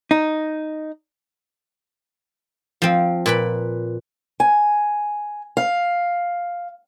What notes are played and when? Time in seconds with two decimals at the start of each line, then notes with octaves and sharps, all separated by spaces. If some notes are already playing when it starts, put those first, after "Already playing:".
0.11 D#4
2.82 F3 C4
3.26 A#2 B4 B5
4.40 G#5
5.57 F5